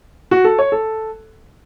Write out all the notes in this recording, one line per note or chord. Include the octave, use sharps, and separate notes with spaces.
F#4
A4
C#5
A4